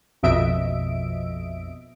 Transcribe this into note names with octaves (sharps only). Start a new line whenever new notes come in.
A#1 F2 B2 D#5 E5 D7